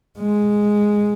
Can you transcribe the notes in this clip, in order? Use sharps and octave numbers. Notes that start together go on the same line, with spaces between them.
G#3